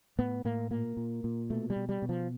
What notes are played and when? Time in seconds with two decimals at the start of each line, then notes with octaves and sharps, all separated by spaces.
0.18 A2 B3
0.45 A2 A#3
0.71 A#2 A#3
0.97 A#2
1.24 A#2
1.50 B2 A3
1.70 G3
1.76 B2
1.89 G3
2.02 B2
2.09 F3